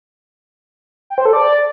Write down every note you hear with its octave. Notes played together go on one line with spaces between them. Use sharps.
G5
C5
A4
D5